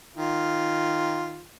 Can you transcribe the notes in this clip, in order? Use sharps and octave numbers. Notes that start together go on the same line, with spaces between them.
D#3 F4